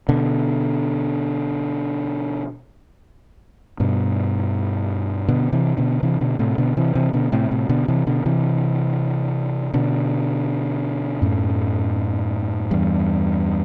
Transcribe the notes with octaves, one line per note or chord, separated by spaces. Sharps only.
B2 D3
G2 B2
B2 D3
C3 E3
B2 D3
C3 E3
B2 D3
A2 C3
B2 D3
C3 E3
C3 E3
B2 D3
A2 C3
A2 C3
B2 D3
C3 E3
B2 D3
C3 E3
B2 D3
F#2 A2
E2 G2